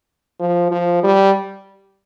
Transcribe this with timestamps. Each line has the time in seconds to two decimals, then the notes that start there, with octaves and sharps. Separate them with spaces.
0.40 F3
0.71 F3
1.03 G3